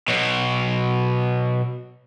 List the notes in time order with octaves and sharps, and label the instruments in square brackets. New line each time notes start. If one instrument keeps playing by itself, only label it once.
[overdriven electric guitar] B2 F#3